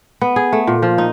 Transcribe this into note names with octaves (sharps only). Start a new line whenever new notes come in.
B3
G#4
A3
A#2
F3
D#4